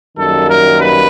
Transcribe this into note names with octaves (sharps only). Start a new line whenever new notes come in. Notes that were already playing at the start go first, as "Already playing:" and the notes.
F#2 D#3 G3 A#3 A4
A#4
B4